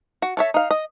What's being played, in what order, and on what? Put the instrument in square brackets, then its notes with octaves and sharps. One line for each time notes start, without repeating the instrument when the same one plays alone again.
[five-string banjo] F#4
A4 C#5 E5
D#4 F5
D#5